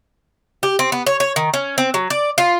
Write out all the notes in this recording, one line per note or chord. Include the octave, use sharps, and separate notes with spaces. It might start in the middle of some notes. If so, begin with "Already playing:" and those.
G4
C4
B3
C#5
C#5
D#3
C#4
C4
F#3
D5
F4